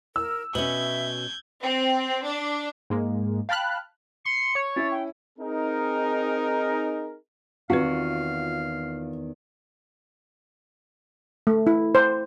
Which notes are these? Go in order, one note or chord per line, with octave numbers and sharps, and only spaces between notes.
A#4 E6
B2 C#4 E5 G6 G#6 F#7
C4
D4
G#2 G#3 A#3
F5 G5 A5 B5 F6 F#6
C6 C#7
C#5
C#4 E4 A6
G5
C4 D#4 G#4 A#4
E2 D#3 C4 F4 F#4 B4 F5
A3
E4
C5